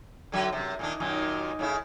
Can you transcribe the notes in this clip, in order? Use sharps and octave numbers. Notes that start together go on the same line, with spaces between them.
D3 F#3 E5
F#2 C3
A#2 D#3 D4
F#2 A#2 D#3
A2 C#3 E4